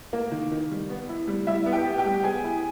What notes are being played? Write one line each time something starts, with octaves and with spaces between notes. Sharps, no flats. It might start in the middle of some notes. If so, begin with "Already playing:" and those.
A#3
D#3
D#3
G3
B3
E4
G3
G3 E4 E5
B3
G4 G5
B3
G4 G5
G3
B3 G#4 G#5
E4